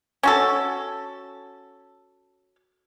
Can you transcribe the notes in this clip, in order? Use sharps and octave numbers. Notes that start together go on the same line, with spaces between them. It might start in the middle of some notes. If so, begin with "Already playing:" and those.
C#4 F#4 A4